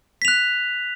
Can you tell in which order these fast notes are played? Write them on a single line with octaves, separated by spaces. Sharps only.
B6 F7 F#6